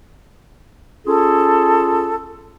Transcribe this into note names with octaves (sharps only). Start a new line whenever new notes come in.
C#4 F4 G#4 A4